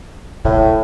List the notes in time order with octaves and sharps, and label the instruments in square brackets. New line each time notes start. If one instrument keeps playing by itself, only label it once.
[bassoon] A2 [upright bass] C#3